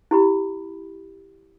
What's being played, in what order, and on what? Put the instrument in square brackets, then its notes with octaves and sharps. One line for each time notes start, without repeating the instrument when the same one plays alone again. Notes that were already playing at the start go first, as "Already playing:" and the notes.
[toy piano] E4 G4 B5